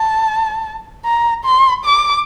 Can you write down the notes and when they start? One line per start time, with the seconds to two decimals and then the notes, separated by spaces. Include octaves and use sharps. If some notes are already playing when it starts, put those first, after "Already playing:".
Already playing: A5
1.05 A#5
1.45 C6
1.85 D6